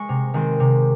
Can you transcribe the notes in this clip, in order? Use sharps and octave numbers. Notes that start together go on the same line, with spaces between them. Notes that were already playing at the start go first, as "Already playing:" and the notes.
Already playing: G#3 C#6
C3
D#3 G#3 C4
C3